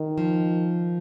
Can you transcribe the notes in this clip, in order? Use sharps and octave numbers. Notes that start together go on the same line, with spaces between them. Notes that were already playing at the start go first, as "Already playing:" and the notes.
Already playing: D#3
F3